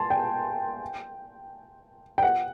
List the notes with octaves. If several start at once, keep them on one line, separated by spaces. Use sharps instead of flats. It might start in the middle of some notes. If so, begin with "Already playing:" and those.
Already playing: G#5 A5 C6
G5
G5
F#5